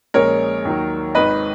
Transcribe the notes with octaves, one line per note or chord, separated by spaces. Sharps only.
A#1 A#2 G#3 C#4 A#4 C#5
D#2 D#3 F#3
G#1 G#2 D#3 B4 D#5